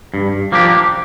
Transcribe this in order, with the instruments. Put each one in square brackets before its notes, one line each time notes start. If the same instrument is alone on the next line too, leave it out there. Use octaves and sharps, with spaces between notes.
[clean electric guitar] G2
F3 A#3 D4 G4